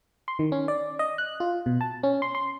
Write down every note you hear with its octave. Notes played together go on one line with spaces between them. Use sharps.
C6
D#3
C#4
D5
D#5
F#6
F4
B2
A5
C#4
C6
C6